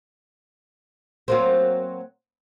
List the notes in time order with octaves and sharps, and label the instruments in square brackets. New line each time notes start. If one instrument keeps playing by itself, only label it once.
[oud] F#3 A#3 C4